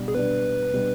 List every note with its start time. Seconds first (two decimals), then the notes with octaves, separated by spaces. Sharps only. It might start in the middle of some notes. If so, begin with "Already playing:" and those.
Already playing: B2 G3 D4
0.08 G#4
0.14 B2 G3 D4 B4
0.72 B2 G3 D4